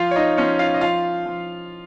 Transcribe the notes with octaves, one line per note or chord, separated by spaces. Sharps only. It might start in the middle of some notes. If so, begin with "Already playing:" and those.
Already playing: F3 F4 F5
C#5
D#4 D#5
F3 C#4 C#5
F4 F5
D#5
F3 F4 F5
F3